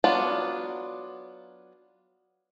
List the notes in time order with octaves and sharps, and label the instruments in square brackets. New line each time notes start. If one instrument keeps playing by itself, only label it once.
[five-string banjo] F#3 B3 D4 F4